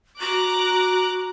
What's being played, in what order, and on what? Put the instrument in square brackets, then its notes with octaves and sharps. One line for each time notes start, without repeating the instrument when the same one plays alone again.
[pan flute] F#4 [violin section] A#5 D6 F#6